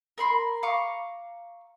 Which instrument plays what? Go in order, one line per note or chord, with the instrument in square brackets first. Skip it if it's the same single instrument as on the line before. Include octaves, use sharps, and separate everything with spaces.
[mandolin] A#4 B5 C6
F5 A#5 C#6 D6